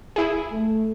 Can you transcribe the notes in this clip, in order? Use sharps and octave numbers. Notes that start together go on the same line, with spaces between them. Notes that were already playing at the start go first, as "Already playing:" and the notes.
E4 G#4
A3